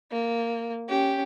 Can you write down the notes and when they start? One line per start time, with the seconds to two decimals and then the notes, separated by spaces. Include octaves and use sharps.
0.11 A#3
0.89 C#4 G4